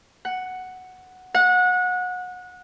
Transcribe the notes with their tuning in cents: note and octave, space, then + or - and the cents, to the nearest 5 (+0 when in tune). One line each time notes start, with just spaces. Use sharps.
F#5 +0
F#5 -25